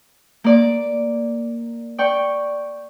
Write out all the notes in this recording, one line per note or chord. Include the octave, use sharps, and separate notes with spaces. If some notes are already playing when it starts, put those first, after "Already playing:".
A#3 D5 D6
D5 G5 C#6